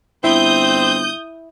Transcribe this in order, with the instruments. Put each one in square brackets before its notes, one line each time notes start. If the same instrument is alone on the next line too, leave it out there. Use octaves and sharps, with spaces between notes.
[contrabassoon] G1 [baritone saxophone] C4 [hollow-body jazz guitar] E4 [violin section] D#6 G6